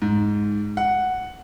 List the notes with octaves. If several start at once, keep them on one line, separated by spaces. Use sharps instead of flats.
G#2
F#5